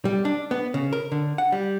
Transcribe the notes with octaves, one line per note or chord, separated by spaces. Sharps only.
G3
D4
B3
C#3
A#4
D3
F#5
G3